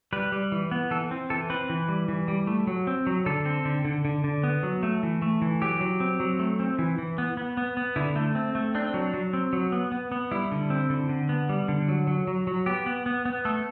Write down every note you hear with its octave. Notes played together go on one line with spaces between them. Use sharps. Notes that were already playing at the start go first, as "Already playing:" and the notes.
G3 B4
G3
E3
B3
E3 A4
C4
E3 A4
C4 B4
E3
G3
E3
G3
A3
F#3
C4
F#3
D3 A4
C4
D3
D3
D3
D3
B3
F#3
A3
E3
A3
E3
F#3 G4
F#3
C4
F#3
A3
C4
E3
E3
B3
B3
B3
B3
D3 E4
A3
C4
A3
C4 D4
F#3
F#3
C4
F#3
B3
B3
B3
G3 E4
D3
C4
D3
D3
B3
G3
D3
F#3
F#3
F#3
F#3
B3 G4
B3
B3
B3
A3 A4